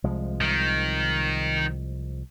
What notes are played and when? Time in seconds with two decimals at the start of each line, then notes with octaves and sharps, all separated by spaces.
0.04 C2 F3 G#3
0.41 D#3